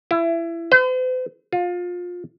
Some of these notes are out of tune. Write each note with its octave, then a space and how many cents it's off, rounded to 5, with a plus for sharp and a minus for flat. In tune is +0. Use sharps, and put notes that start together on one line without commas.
E4 +25
C5 -45
F4 +25